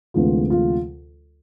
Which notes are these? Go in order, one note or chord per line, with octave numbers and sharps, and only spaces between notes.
D2 C3 E3 G#3 B3 F4
F4